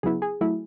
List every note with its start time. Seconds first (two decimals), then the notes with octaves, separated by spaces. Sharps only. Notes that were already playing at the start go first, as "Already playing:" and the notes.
0.03 C#3 F#3 B3 E4 G#4
0.22 G#4
0.41 F#3 A3 E4